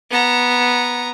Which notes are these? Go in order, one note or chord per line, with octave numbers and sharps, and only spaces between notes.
B3 A#5